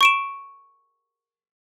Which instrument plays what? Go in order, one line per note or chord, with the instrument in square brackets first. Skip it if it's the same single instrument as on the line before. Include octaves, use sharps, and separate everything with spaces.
[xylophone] C#6 D7 E7